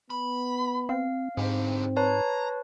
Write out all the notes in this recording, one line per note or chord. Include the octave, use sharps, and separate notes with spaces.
B3 B5
C4 F5
G#2 D3 C4 G4
B4 C#5 A5 A#5